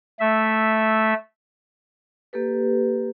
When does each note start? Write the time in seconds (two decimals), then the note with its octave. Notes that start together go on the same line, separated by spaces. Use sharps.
0.20 A3 E5
2.33 A#3 G4 A4 B4